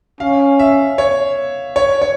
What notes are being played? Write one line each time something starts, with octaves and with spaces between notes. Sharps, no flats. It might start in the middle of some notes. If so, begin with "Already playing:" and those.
C#4 F5
E5
C#5
C#5
C#5